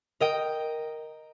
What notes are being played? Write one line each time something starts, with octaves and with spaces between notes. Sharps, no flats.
A#4 D#5 G5